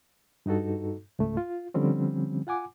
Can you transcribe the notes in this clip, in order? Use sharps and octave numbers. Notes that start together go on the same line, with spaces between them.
G2 D#4 F#4 A4
C#2 G#2 A3
F4
D3 F3 G3 C4 C#4
F4 F#5 G#5 D6